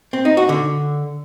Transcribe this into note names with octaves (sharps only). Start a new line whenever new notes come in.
C4
D#4
F#4
D3